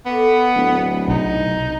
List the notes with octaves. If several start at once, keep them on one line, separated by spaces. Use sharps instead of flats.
B3 A4 D#5 D6
D1
B1 C3 C4 D#4 G#6